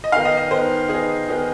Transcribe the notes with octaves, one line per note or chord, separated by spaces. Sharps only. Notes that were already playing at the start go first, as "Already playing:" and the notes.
D#5
D#3 B3 D#4 F5
D#5
D#5
D#3 B3 D#4 C5
D#3 B3 D#4 G#4
D#3 B3 D#4